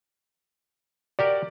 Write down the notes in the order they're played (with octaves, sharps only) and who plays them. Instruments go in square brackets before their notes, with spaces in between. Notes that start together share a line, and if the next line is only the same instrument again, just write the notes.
[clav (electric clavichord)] F#4 G4 A#4 [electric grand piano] D5